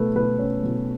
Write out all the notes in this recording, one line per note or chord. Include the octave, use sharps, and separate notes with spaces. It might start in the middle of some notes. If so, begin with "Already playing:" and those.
Already playing: B2 A3 A4 B4
B2 B4
C#4
B2